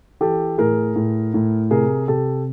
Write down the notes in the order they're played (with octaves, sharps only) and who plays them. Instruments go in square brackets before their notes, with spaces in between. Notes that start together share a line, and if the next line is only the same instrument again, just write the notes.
[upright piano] E3 G4 A4
A2 G#4 A#4
A2
A2
C3 G#4 A#4
C3 G4 A4